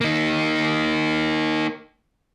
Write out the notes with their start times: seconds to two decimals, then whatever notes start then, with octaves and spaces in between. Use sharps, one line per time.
0.01 A#3 D#4